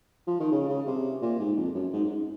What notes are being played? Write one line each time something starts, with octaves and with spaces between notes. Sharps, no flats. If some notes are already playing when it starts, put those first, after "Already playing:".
F3
D#3
C#3
C#3
C3
A#2
G#2
F2
F#2
G#2
G#2